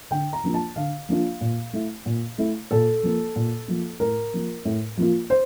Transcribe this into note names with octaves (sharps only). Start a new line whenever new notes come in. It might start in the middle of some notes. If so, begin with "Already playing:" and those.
D3 G5
A#5
F3 A#3 D4 F4
A5
D3 F5
F3 A#3 D4 F4
A#2
A3 E4
A#2
A3 E4
A#2 A4
F3 A#3
A#2
F3 A#3
A2 A#4
F3 A#3 F4
A2
F3 A#3 F4
C5